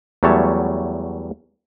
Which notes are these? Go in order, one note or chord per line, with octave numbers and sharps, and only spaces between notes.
E2 F#3 G3 A3 C#5 A5